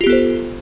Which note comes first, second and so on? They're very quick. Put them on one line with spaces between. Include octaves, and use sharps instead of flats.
F4 G4 B3 A4 C5